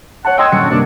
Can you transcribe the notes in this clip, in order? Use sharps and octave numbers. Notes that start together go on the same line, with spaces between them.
C#5 F#5 A5
D#5 G5 C6 E6 G#6
D#1 F#2 C#4 D4 F#4 C#7
G2 C3 A#3 D4